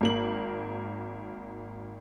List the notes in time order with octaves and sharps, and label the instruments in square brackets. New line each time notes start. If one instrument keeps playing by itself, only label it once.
[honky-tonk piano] G#1 A#3 F#7